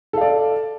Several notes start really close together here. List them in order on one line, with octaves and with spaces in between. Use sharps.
A4 F5 D5